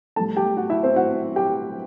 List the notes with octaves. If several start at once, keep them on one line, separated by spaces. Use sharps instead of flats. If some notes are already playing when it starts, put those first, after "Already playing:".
A2 G3 A4 A5
G4 G5
F#4 F#5
E4 E5
C4 C5
F#4 F#5
G4 G5